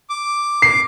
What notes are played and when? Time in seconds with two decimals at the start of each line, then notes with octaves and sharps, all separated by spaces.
0.10 D6
0.62 C7